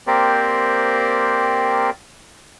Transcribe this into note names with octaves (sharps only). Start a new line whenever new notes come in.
A#3 C4 G4 A#4 C5 D5